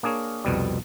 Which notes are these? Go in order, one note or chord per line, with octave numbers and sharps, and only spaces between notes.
A#3 D4 G#4 A#4 C#5
C2 F2 B2 G3